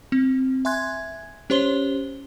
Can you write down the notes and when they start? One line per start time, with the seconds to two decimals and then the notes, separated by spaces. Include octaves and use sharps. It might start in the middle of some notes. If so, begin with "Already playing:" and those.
0.12 C4
0.65 E5 G#5 C6 F#6 G#6
1.50 C#4 G4 C5 C#5 C6 G7